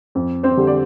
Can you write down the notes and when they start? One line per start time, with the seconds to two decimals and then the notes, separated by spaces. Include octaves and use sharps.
0.15 F2
0.43 C4 C5
0.57 D3 G3
0.67 D5